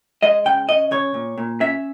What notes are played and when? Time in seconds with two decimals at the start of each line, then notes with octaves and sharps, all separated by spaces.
0.22 G#3 D#5
0.45 C#3 G5
0.68 C#4 D#5
0.91 C#3 C#5
1.14 A#2
1.38 A#2
1.60 C#4 E5